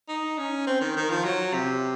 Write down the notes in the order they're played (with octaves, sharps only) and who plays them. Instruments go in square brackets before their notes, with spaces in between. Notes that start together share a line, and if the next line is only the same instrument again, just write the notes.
[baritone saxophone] D#4
C#4
C4
D#3
D#3
F3
F#3
C3